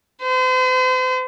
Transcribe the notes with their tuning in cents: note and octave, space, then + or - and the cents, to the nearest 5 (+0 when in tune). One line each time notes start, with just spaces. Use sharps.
C5 -40